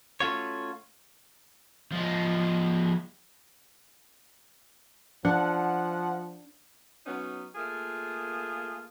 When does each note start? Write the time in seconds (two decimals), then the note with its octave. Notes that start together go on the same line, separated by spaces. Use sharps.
0.20 A3 C#4 F4 F#4 C#5
1.92 F3 G#3
5.25 F3 D4 F#5
7.06 F#3 B3 C#4 D#4
7.55 A3 A#3 F4 G#4